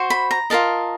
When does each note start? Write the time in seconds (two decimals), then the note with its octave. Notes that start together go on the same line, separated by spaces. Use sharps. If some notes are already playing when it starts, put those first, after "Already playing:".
Already playing: F#4 C5
0.10 B5
0.31 A#5
0.50 F4 A#4 D#5 A5